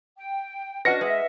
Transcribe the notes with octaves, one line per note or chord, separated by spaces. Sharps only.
G5
C#4 D4 F#4 B4 D#5 F#5 A#6 C#7
G#3 B4 E5